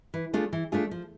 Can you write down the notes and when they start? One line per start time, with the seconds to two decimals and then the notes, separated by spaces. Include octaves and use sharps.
0.14 E3
0.33 A3 D4 F4 G#4
0.53 E3
0.72 A3 D4 F4 G#4
0.91 F3